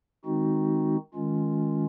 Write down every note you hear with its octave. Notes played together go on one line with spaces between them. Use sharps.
D#3 G#3 C4 D#4 F#4
D#3 G#3 C#4 F4